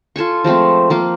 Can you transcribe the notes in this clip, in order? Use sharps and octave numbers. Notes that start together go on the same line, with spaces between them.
F4 A4 G#5 C#6
F3 G#3 A3 C4
F3 A#3 F4